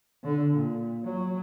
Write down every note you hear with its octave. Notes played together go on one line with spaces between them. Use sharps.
D3
A#2
F#3